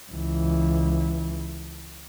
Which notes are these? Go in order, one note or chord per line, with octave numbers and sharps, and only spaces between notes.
C#2 E3